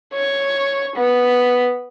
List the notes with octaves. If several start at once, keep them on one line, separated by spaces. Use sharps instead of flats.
C#5
B3